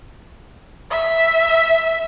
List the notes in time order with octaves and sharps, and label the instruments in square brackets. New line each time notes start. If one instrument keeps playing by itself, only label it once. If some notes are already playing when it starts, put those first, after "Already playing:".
[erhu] E5